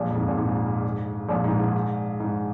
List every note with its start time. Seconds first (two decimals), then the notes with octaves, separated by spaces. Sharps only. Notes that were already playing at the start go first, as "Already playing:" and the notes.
Already playing: A#1 A#2
0.10 F2
0.16 G#2
0.28 A#2
0.38 G#2
1.29 A#1 A#2
1.44 G#2
1.60 G#2
2.20 G#2